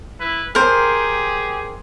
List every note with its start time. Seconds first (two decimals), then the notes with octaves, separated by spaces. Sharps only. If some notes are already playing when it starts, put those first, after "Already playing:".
0.19 E4 B4
0.55 G4 G#4 A#4 C5